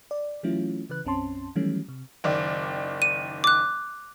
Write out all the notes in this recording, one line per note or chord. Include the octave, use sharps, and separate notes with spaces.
D5
E3 F#3 A3 C#4 E4 F4
C#3 E3 B4 F#6
B1 F#2 C4 C#4 A5 C6
D#3 E3 F#3 G3 A3 C#4
C3
F#1 D#3 D5
D#7
D6 F#6